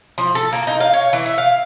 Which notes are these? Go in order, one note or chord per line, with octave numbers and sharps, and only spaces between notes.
F3
A4
A#3
D#4
F5
C#5
E3
E5
F5